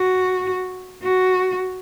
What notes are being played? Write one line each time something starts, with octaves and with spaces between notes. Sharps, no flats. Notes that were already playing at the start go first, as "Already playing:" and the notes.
Already playing: F#4
F#4